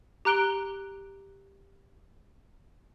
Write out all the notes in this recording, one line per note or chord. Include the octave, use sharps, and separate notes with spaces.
G4 A#5 F#6 D7 G7